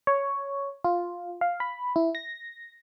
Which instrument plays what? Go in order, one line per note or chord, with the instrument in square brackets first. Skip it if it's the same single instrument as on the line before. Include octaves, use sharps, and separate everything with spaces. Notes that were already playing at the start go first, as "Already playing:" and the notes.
[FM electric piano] C#5
F4
F5
B5
E4
A#6